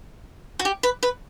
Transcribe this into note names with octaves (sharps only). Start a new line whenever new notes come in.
F#4
G4
B4
B4